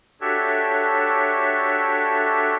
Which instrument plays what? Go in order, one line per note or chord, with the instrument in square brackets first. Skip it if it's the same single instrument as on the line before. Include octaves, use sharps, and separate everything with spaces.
[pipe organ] D4 F#4 G4 A4 C#5 E5